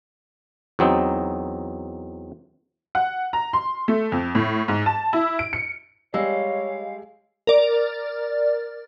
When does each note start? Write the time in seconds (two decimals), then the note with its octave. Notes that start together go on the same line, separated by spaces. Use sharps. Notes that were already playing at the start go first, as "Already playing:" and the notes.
0.79 E2 F#3 C4 D#4
2.95 F#5
3.33 A#5
3.53 C6
3.88 A3
4.12 F2
4.35 A2
4.68 G#2
4.86 A5
5.13 E4
5.39 D7
5.53 C#7
6.14 G3 G#3 C#5 F5 E6
7.47 A#4 D5